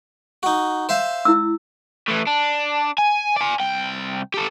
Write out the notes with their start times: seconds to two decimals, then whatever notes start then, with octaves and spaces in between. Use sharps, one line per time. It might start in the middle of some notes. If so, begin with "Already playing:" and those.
0.43 D#4 F#4
0.89 C5 E5 F5
1.25 E4 E6
2.08 A2 E3
2.27 D4
2.98 G#5
3.36 D5 G#5
3.60 C2 G5
4.34 G4 A4